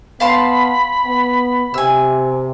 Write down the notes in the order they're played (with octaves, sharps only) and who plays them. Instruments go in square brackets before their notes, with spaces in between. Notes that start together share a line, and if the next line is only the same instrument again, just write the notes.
[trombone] B3 [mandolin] F5 A5 C6 [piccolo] B5
[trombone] B3
[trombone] C3 [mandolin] G#5 E6